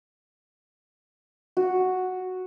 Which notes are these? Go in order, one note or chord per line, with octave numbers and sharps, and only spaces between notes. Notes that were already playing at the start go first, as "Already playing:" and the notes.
F#4